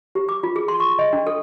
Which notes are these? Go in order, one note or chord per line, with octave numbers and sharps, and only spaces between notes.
G4
D6
F4
G#4
C6
C#6
D#5
D4
A4